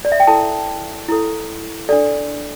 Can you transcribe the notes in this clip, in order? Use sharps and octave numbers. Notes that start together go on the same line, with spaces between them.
D5
E5
G5
E4 A4 A5
E4 A4
D4 A4 D5